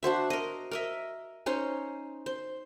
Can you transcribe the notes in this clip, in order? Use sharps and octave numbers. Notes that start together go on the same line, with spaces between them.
D4 F#4 C5 E5
A#4 D#5
A#4 D#5 E5
C#4 D#4 C5
C5